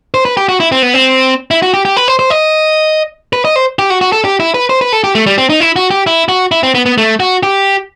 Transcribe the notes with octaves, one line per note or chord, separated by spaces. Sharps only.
C5
B4
G4
F#4
E4
C4
B3
C4
E4
F#4
G4
G4
B4
C5
C5
D#5
B4
D#5
C5
G4
F#4
F#4
A4
G4
E4
B4
C5
B4
A4
G4
A3
G3
C4
D#4
E4
F#4
G4
E4
F#4
E4
C4
B3
B3
A3
F#4
G4